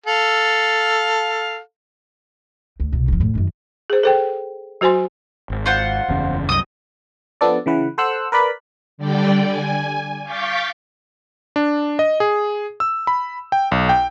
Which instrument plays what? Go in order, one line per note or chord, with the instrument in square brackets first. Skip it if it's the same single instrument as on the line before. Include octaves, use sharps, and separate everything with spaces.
[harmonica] A4 F5
[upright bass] D2
C2 B2
D1 F3
F2 A2
F#2 D#3
[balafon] G#4 C5
A4 C5 G5
F#3 F#4 C5 G#5 C6
[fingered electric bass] G#1
[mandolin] F4 C5 F#5
[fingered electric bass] F#1 E2 C#3
[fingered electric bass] C2 F#2 [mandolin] D#5 D#6
[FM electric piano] F3 B3 D4 A4 D5
C#3 E3 B4 F#5
A4 C5 F#5 E6 F#6
A#4 B4 D5 B5
[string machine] D3 G3 D5 G5
G#5
F5 C#6 D6 G6 A6 B6
[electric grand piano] D4
D#5
G#4
E6
B5
G5
B1
G5